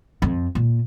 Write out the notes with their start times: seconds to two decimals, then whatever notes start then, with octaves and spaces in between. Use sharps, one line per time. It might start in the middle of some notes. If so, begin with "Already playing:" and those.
0.22 F2
0.55 A#2